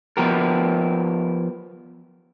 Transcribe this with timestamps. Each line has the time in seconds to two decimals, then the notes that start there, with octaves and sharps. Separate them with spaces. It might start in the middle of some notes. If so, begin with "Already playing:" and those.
0.17 F3 B3 G4 A#4